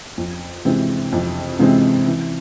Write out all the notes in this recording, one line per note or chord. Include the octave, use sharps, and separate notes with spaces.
F2
C3 E3 G#3 C4
F2
C3 E3 G#3 C4
E3